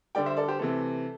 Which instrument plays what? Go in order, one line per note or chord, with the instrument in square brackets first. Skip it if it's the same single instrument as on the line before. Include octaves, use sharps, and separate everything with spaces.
[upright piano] D3 G3 D5 G5
C5 E5
A4 D5
G4 C5
C3 E3 A3 A4